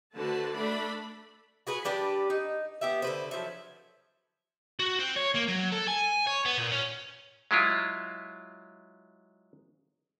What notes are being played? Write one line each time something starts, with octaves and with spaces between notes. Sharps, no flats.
D3 A3 F#4 B4 C5 A5
A3 D4 A4 D5 E5 B5
F#4 G#4 B4
G3 D4 G4 B4
D#4
B3 G4 E5
D3 B4 C5
F3 F#3 E5
F#4
C4
C#5
A#3
F#3
A4
G#5
C#5
B3
A#2
C#4
F#3 G#3 E4 F4